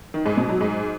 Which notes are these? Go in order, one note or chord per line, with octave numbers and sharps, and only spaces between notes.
D#3
G#2
B2
F#3
G#2